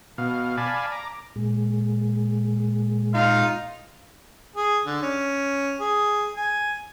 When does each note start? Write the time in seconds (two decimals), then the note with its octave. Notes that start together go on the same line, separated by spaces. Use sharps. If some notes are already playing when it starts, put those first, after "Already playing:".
0.18 B2 F5
0.57 D5 F5 G#5 A5 B5
0.92 A#5 D6
1.36 A#2 G#3
3.13 D#4 F4 F5
4.56 G#4
4.86 D3
5.03 C#4
5.80 G#4
6.36 G#5